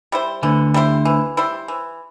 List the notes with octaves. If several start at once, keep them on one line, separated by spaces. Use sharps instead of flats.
G3 E4 C5
D2 D3 E3
G3 E4 C5
E3
G3 E4 C5
E3